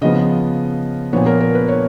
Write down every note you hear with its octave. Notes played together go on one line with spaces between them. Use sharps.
C#3 F3 B3 D#5
A#2 F3 B3 C#5
A#4
A#4
B4
C#5